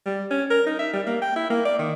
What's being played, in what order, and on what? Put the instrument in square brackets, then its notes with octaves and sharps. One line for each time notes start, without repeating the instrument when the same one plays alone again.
[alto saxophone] G3
C#4
A#4
D#4
E5
G3
A#3
G5
E4
A#3
D5
D#3